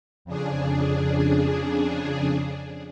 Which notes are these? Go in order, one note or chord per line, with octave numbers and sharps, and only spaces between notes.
F2 C#3 D4 G#4